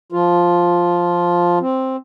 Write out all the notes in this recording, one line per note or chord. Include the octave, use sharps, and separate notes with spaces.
F3 F4
C4